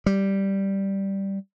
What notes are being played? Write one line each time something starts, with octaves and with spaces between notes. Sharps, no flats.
G3